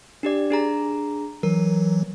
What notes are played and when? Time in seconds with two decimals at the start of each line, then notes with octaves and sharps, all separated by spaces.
0.23 D4 G4 D5
0.50 D4 G#4 A#5
1.43 E3 F#3 A#4